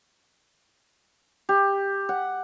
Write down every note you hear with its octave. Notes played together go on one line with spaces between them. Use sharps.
G4
F#5